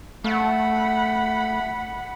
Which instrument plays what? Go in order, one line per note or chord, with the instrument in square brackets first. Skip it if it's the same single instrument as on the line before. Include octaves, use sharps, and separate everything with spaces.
[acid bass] A3 [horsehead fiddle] F#5 B5